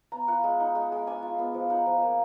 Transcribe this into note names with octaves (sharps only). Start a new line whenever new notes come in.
B3 A#5
F4 F#5
G#3
D#4
G#3
G#3
D4 G#5
F4
B3
F3
D#4 F#5
F3
A#3